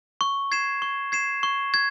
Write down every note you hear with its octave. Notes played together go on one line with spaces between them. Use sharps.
C#6
G#6 C7 E7
C#6
G#6 C7 E7
C#6
G#6